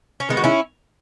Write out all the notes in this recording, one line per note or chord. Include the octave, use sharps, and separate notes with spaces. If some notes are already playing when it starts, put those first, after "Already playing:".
C#4
D#3 G#3 B3 D#4
F#4
C#4 E4